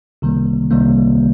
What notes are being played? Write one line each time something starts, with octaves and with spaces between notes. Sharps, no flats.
C2 C3 D#3 G3 A#3
C2 C3 D#3 G3 A#3